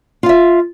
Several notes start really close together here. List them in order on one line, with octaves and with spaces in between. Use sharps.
F4 F5 E5